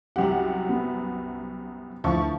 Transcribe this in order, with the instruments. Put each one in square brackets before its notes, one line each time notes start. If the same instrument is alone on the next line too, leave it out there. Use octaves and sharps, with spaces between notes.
[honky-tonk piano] C2 F#2 F#5 [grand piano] G4
[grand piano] B3
[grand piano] D2 E3 F5 [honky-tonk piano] F3 C#6